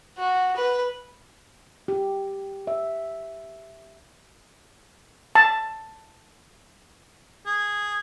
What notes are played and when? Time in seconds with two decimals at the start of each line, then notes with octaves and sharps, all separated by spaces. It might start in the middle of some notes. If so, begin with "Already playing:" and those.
0.18 F#4
0.57 B4
1.88 G4
2.67 E5
5.35 A5
7.46 G#4